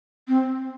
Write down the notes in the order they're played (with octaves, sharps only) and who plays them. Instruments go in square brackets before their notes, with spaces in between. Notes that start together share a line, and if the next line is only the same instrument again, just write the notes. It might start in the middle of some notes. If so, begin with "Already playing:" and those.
[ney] C4